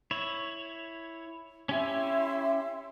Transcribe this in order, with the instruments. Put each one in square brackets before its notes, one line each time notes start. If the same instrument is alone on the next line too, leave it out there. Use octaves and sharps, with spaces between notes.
[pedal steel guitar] E4 C#5
[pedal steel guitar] C#4 G4 G#5 [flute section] E4 E5 C6